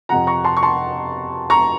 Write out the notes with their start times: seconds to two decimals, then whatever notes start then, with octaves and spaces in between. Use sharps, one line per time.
0.09 F2 C3 F3 F#5 A#5
0.27 A#5 C#6
0.44 A5 C6
0.57 C#6
0.63 A5 C6
1.50 A#5 C#6